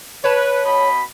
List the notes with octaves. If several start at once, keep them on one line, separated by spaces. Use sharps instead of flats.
B4 C#5 A5
B2 D#5 B5